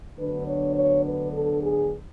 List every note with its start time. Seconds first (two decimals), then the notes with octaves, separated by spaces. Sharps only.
0.18 D2 D3 F#3 B3 D4 B4
0.46 C#5
0.75 C#5
1.04 B4
1.33 A4
1.61 G#4